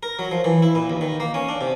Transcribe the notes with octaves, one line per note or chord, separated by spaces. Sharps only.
A#4
F#3
F3
E3
E4
A#2
D#2
D#3
A#3
C#4
D4
C3